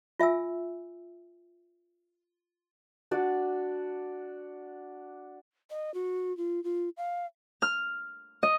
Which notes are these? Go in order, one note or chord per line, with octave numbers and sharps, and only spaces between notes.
F4 E5 G#5 E6
D4 F#4 D5
D#5
F#4
F4
F4
F5
F6
D#5